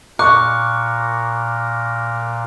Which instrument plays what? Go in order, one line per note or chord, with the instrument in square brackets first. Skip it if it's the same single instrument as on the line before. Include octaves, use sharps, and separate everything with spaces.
[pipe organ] A#2 A#4 [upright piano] C#6 [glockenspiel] D6 F#6